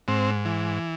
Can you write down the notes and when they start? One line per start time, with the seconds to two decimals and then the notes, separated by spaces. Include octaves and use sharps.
0.08 G#2 C4
0.45 E3